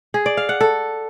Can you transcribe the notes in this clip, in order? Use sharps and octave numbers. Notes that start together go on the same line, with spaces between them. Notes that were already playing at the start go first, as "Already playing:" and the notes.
G#4
D5
F5
F#5
A4